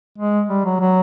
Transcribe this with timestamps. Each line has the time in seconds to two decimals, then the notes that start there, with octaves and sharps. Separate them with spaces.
0.18 G#3
0.50 G3
0.65 F#3
0.80 F#3